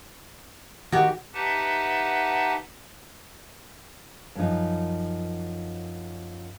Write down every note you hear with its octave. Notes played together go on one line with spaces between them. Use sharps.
D#3 F#4 G4
D#4 G4 B4 E5 F#5 A5
F#2 F3 D#4